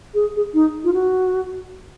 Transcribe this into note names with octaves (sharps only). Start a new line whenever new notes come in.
G#4
G#4
D#4
F4
F#4